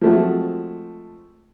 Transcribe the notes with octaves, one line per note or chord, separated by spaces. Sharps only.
F3 G#3 A3 C4 F#4